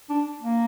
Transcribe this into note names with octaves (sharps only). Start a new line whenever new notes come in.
D4
A#3